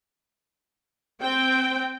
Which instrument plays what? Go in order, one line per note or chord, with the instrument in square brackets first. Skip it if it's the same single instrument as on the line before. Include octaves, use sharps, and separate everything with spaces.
[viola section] C4 G5